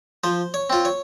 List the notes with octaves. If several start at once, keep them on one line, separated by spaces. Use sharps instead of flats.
F3 C5
C#5
C4 F4
C#5